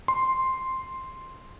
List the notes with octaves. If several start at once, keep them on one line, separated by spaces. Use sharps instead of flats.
C6